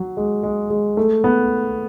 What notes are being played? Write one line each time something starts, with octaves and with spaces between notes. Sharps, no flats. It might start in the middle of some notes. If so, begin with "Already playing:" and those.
Already playing: F#3
G#3
G#3
G#3
A3
B3